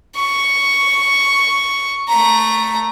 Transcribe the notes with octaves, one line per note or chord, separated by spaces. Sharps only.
C#6
A3 A#5